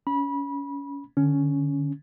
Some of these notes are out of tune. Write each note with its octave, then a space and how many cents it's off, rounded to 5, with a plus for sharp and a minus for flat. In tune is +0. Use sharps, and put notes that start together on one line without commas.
C#4 +25 B5 -25
D3 +15 C#4 +10